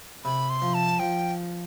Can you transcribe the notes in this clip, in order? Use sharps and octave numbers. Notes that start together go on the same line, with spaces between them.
C3 B5
C6
F3
A5
F3 G5